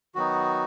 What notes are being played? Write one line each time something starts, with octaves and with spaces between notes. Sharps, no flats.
D#3 F#3 B3 D#4 F#4